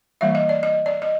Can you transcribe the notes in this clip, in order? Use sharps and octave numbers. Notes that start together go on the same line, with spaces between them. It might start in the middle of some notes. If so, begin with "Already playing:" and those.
E3 G3 A#3 E5
D#5
D5
D#5
D5
D#5